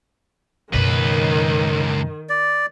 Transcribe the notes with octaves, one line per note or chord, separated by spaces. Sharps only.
C#2 F#2 B2 D#3 B4
D5